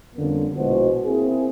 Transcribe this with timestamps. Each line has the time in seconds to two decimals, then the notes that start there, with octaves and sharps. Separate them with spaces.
0.15 F2 D3 G3 A#3 B3 C#4
0.56 A#1 B2 G#3 E4 F#4 C5
1.05 A#3 C4 E4 G#4